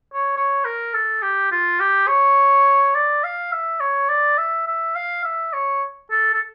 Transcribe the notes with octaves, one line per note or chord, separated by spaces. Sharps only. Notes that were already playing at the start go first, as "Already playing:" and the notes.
C#5
C#5
A#4
A4
G4
F4
G4
C#5
D5
F5
E5
C#5
D5
E5
E5
F5
E5
C#5
A4
A4